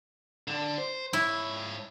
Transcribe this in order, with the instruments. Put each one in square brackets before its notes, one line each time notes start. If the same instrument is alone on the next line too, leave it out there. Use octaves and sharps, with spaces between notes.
[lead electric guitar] D3 D4
C5
[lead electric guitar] G#2 C#5 [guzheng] E4